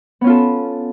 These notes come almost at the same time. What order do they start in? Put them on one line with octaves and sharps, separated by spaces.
B3 C#4 F4 A4